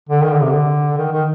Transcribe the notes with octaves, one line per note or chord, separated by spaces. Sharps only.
D3
D#3
D3
C3
D3
D#3
D#3